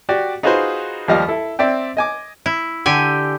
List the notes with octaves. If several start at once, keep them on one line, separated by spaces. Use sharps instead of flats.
F#4 G4 D5
D#4 F4 F#4 G#4 B4 C5
D#2 F3 G3 G4 D#5 F5
E4 A4
C4 D5 E5 G5
D#5 G#5 D6
E4
D3 G4 G#5